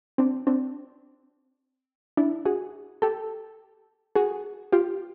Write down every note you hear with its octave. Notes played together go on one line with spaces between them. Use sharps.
C4 D4
C4 D4
D4 E4
F#4 G#4
G4 A4
F#4 G#4
F4 G4